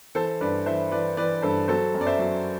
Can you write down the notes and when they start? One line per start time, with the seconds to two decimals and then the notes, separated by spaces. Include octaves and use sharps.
0.15 E3 A4 C5
0.41 G2 B4 D5
0.66 E3 C5 E5
0.91 E3 B4 D5
1.17 E3 B4 D5
1.42 G2 A4 C5
1.68 F#3 A4 C5
1.94 F#2
2.01 D5
2.06 C5 E5
2.19 F#3